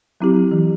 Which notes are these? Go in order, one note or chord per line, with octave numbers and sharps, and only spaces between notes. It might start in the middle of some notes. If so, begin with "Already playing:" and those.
F#3 C4 E4 G4
E3